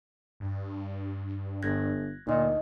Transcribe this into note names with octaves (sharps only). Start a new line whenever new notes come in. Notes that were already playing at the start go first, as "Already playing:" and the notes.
G2
G1 F#6 G#6 A#6
D2 A#2 D#4 D#5